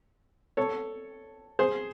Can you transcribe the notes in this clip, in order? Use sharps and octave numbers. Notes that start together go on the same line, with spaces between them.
A4 C#5
G#4 C5